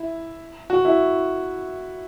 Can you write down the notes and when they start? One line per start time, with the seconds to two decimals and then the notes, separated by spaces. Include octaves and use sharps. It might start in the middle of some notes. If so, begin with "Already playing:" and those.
Already playing: E4
0.70 F#4
0.85 E4